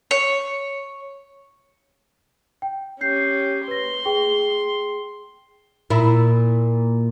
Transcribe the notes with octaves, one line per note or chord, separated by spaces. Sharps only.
C#5
G5
C#4 G4 G6 C7
B4 C6 A#6
G#4 G5
A#2 E4